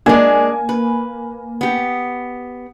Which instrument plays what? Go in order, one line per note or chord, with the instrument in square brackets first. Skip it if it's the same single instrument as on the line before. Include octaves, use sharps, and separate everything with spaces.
[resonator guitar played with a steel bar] G#3 D4 [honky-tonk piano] A#3 G#5 G#6
[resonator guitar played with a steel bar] B4
B3 G4